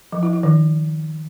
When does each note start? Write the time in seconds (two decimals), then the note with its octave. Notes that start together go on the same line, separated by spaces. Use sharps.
0.12 F3
0.23 E4
0.33 E4
0.43 D#3